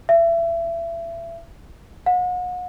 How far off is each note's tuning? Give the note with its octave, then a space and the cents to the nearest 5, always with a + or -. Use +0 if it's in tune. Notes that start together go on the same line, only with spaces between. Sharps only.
E5 +30
F#5 -40